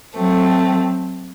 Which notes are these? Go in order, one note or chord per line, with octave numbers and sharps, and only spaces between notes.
F#3 A3 C4